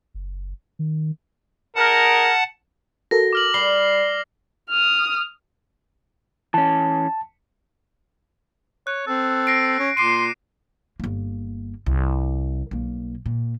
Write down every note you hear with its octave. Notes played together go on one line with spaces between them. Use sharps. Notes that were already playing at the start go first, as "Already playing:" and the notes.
F#1
D#3
D#4 G#4 A#4 F#5 A5
F#4 A4 A#4 A#6
D6 F6 F#7
G3 B5 C7 G7
D#6 F6
E3 C#4 A5
C#5 F#6
C4 A4
A#6 C7 D7
C#4
A#2 C6 D6 C7 D#7
G1 A#3
C2
B1 A#3
A#2